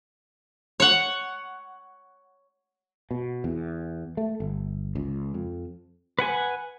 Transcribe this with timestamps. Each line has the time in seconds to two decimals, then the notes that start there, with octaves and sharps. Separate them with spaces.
0.80 C#5 F#5
3.11 B2
3.44 E2
4.17 A3
4.40 G1
4.95 C#2
5.34 F2
6.19 B4 F#5 G#5